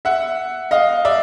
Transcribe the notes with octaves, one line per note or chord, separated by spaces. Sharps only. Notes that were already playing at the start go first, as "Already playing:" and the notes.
E5 F#5
D#5 F5
D5 E5